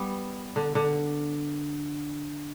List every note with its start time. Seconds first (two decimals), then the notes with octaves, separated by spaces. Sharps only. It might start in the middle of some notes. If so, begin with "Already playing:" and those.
Already playing: G3 B3
0.56 D3
0.75 D3